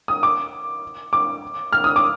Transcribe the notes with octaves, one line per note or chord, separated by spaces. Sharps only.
D#6
D6
D6
F6
D#6
D6